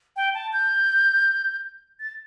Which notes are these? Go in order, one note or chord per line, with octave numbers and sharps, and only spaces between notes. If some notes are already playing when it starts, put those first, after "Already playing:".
G5
A5
G6
A6